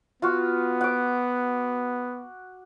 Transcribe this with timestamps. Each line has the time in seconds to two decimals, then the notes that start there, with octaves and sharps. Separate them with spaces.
0.22 B3 F4 F#4
0.81 F#5 D6